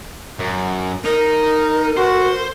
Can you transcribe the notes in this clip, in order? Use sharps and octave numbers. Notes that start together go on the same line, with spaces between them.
F#2
D#4 A#4
F#4 C5